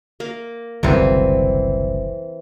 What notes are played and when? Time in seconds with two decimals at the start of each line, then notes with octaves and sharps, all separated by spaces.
0.20 A#3
0.83 F#1 C2 D3 E3 C4